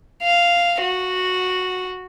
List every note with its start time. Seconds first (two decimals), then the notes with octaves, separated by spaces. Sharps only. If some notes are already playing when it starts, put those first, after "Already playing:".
0.23 F5
0.82 F#4